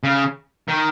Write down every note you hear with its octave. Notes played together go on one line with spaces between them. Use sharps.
C#3
D#3